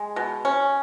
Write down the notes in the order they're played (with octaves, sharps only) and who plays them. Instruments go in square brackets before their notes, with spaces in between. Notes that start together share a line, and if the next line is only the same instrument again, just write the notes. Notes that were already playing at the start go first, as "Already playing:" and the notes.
Already playing: [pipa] G#3
B2
C#4